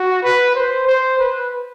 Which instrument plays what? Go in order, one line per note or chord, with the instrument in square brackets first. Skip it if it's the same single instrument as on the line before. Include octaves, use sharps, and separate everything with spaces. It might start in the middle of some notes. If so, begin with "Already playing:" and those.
Already playing: [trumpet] F#4
B4
C5
C5
B4